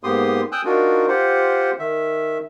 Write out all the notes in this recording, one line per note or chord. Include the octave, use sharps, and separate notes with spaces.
G#2 A#3 B3 G4 C6 D#6
G5 G#5 D#6 E6 F#6 G6
D4 D#4 F4 F#4 A#4
F4 G4 C5 F#5
D#3 E5